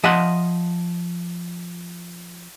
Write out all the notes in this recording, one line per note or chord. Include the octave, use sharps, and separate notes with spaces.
F3 D#5 E5 F#5 C6